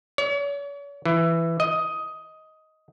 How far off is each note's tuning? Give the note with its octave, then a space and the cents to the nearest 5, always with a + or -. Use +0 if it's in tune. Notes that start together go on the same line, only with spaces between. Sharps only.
C#5 +40
E3 +10
D#5 +10